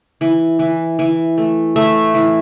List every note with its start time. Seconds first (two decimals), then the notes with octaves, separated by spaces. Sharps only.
0.21 E3
0.59 E3
0.99 E3
1.38 A3
1.76 A3 E5
2.14 E3